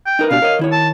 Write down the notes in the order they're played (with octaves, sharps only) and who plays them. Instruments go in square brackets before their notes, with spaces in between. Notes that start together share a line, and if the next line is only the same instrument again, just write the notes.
[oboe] G5
[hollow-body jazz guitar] D#4 A#4 B4
[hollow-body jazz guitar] B2 D4 G4 [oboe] F5
[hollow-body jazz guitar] A#4 C#5 D#5
D#3 E4 C#5
[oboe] A5